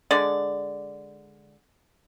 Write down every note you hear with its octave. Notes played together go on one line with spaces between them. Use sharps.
D3 G#3 D5